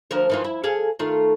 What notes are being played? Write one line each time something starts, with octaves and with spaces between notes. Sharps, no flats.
D2 F3 A#4
D#3 E3 F4
E4
G#4 A4 F5
D#3 A3 F4